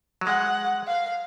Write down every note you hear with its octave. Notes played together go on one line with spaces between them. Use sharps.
F#3
G#3 F#5
F5